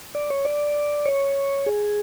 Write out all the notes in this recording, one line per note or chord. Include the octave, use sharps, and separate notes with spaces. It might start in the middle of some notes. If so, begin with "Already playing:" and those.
D5
C#5
D5
C#5
G#4